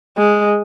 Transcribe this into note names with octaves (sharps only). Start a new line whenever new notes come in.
G#3